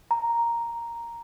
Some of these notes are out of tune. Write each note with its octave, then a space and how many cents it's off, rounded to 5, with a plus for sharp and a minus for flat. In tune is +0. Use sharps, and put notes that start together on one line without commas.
A#5 +0